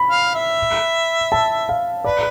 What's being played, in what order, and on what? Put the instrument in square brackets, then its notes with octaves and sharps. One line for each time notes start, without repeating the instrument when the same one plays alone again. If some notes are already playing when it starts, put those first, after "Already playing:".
Already playing: [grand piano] B5
[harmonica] F5
E5
[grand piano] A5
F5
[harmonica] B4 [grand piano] D5